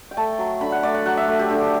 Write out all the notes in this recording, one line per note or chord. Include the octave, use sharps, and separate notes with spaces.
G5
A3 A5
F#3
D3 B5
F#5
A3 D5
F#5
F#3 F#5
E5
A3
G4
D3 G4